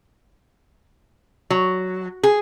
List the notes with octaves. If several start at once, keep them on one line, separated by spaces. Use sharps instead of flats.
F#3
G#4